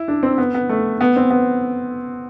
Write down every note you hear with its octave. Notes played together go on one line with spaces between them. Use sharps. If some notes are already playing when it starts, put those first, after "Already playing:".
Already playing: E4
D4
C4
B3
B3
A3
B3
C4
B3